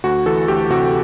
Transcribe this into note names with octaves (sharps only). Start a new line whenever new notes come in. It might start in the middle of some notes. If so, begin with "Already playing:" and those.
D2 F#4
E3 A4
D2 G4
C3 F#4